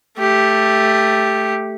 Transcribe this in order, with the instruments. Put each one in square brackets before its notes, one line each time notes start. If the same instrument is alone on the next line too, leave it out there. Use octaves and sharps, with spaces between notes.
[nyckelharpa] A3 G4